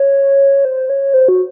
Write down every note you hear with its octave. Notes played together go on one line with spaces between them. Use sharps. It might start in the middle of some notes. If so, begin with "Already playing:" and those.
Already playing: C#5
C5
C#5
C5
F#4